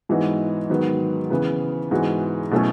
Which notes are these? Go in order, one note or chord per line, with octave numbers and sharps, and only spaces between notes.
G#2 E3 B3 D#4 F#4
G#2 D#3 F#3 B3
C#3 E3 B3
G#2 E3 G#3 B3 F#4
B2 F#3 A3 C#4 E4